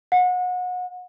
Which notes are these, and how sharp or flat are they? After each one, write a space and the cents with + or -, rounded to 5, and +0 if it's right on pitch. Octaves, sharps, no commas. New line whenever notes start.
F#5 -30